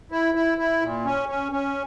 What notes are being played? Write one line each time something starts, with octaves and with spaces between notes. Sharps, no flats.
E4
E4
E4
A#2
C#4
C#4
C#4